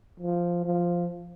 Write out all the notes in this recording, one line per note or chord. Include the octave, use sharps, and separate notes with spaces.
F3
F3